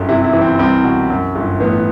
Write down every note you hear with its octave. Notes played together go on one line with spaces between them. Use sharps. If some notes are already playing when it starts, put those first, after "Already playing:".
Already playing: G1 F#2
C3 E4
E4
E3
C4
C2 C4
B2
F#2
G1
A1 B3